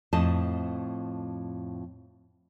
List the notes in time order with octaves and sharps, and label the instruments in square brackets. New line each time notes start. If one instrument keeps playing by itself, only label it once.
[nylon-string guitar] F2 A2 C5 D#5 A5